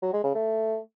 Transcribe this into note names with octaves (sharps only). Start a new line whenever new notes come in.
F#3
G#3
C#3
A3